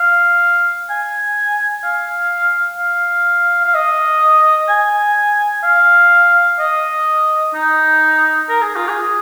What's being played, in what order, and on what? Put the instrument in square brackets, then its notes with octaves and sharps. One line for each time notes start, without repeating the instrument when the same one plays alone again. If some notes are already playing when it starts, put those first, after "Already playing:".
Already playing: [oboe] F5
G#5
F5
F5
F5
D#5
G#5
F5
D#5
D#4
A#4
G#4
F4
G#4